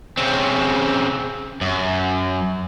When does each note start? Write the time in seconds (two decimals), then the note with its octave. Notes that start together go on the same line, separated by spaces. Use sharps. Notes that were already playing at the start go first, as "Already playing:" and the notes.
0.18 C#3 C4
1.61 F#2